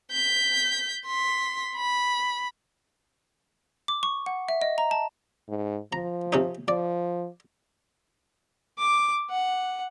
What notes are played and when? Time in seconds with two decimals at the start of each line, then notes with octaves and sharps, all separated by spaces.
0.11 G6 B6
1.06 C6 B6
1.75 B5
3.88 D6
4.03 C#6
4.26 F#5
4.49 E5
4.62 D#5
4.78 A#5
4.91 A5
5.49 G#2
5.93 F3 A#5
6.33 C3 C#4 D#4
6.68 F3 D5
8.79 D6
9.31 F#5